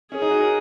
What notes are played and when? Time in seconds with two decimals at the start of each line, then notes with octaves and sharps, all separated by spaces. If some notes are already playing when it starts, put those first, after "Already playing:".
0.11 C#4 G#4
0.22 D#4
0.31 F#4
0.41 A#4